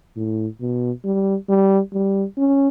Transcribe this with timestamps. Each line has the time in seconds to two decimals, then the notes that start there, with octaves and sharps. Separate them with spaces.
0.16 A2
0.61 B2
1.04 G3
1.49 G3
1.93 G3
2.37 C#4